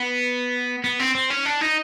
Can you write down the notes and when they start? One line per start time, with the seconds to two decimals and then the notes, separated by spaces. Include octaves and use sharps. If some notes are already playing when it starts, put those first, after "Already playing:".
Already playing: B3
0.84 B3
1.00 C4
1.15 C4
1.30 C#4
1.46 D4
1.61 D#4